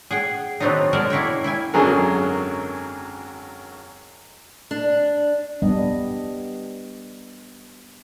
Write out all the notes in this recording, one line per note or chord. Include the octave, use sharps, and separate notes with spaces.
G#4 F#5 G5
D#3 F#3 B3 C4 D4 D#4
B2 G#3 A#4 D5 A5
A#3 E4 C#5 G5
E4 G5 G#5
G#1 F#2 D3 F#3 G#4 A#4
D4
G3 B3 D4 D#5